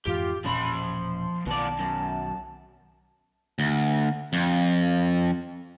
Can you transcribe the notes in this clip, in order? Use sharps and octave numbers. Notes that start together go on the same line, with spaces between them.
F2 G#2 E3 F4 G4
E1 A#2 F3 C#4 B5 C6
B1 B2 D#3 B3 D5 A5
F#2
D2
F2